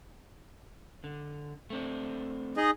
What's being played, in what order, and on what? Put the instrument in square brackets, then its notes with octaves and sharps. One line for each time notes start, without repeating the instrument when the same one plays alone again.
[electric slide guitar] D3
A3 C4 D4
[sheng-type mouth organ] D#4 G#4 D#5